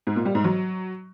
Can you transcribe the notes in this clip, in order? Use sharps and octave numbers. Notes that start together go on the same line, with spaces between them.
G#2
A#2
G3
G#2
F#3